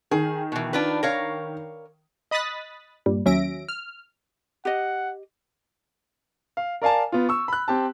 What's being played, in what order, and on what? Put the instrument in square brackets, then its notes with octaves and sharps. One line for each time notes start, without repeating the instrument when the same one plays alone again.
[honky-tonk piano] D#3 [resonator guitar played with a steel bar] G#4
[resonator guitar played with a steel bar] B2 E3
D4 F4 B4
A#4 C#5 F5
[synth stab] D#5 B5 D#6 F#6 A6 B6
G2 A#2 G3
D#2 F#3 C#4 E5 A#6 D7
F6
[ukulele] G4 D#5 [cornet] F#5
[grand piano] F5
A#4 D5 F5 G#5 A5
B3 F4
C#6 E6
B5 F#6
C4 G4 A5